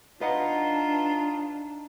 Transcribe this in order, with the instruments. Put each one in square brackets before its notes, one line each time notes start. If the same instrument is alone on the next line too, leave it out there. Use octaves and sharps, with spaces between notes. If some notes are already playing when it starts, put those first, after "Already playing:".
[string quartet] D4 [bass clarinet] D#4 [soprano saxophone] F4 [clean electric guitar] B4 D#5 F#5